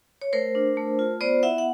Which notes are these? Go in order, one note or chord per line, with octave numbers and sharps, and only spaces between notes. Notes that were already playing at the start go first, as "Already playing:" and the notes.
C#5
A3 A#4 C5
D4
A3
F4
B3 C5 D5
E4 E5 F#5
F#5